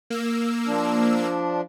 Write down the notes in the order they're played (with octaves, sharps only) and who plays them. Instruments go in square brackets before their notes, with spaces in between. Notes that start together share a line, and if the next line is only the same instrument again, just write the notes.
[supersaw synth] A#3 E6
[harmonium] F3 D4